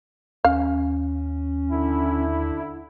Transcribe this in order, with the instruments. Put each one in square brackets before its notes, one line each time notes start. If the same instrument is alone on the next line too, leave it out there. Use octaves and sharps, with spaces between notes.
[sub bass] D#2 [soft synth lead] C#4 [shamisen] F5
[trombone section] D3 E4